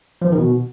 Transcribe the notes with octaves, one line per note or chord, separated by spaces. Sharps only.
F3
E3
D#3
B2